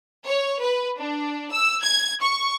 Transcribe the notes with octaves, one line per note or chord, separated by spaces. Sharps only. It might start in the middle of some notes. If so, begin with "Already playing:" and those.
C#5
B4
D4
E6
G#6
C#6